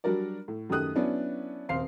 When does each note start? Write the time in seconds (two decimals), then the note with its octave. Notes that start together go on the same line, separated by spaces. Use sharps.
0.04 F#3 G3 D4 F#4 A#4 D5
0.48 A2
0.69 F#2 D#3 A3 G4 D#6 F#6
0.95 F#3 B3 C#4 D4 E4
1.69 D#1 C3 C5 F5 C7